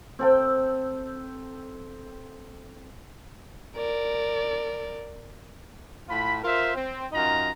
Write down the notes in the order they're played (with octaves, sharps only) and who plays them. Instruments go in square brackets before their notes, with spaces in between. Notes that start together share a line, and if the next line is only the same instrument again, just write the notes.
[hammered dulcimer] C4 A4 G5
[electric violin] A#4 D5
[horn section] A2 F4 B5
F4 A#4 C5 E5
C4
F#2 D#4 F4 A#5